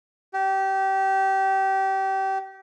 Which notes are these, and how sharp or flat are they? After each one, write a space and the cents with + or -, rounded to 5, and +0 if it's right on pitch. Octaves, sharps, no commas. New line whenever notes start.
G4 -25